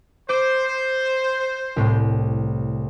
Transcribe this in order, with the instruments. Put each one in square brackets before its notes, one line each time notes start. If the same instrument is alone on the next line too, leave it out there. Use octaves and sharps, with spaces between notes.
[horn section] C5 [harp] D6
[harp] C2 A2